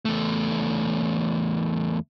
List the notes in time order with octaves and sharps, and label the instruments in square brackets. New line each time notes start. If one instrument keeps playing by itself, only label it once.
[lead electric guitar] E2 A3